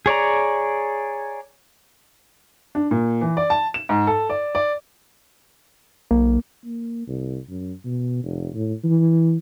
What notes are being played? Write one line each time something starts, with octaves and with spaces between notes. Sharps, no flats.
G#4 C#5 D5 A#5
D4
A#2
E3
D5
A5
E7
G#2
A4
D5
D5
B1 A#3
A#3
C2
F#2
B2
F1
A2
E3